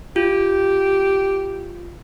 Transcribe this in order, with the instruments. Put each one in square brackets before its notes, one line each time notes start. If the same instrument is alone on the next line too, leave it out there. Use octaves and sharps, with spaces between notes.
[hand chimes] F4 [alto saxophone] G4